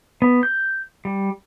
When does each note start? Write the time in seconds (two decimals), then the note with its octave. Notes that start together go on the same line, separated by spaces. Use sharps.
0.22 B3
0.43 G6
1.05 G3